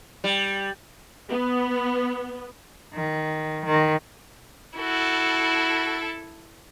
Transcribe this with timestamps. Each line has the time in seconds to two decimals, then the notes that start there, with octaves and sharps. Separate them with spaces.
0.24 G3
1.30 B3
2.94 D#3
3.65 D#3
4.79 E4 F#4 A4